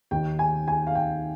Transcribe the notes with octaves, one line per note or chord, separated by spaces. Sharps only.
D#2 D#3 G5
G#5
G#5
F5
G5